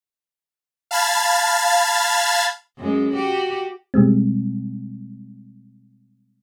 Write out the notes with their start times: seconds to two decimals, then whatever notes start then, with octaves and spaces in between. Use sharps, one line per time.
0.91 F5 A5 B5 F6 G#6 A6
2.78 F#2 G#3
3.13 F#4 G4
3.94 B2 G3 G#3 C4